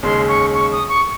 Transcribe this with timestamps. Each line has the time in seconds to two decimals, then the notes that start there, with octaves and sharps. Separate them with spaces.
0.03 D#2 C#3 G#3 C6
0.28 C#6
0.54 C#6
0.72 D#6
0.89 C#6